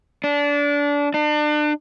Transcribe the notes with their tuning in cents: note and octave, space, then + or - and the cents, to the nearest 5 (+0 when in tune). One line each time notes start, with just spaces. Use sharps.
D4 -25
D4 +35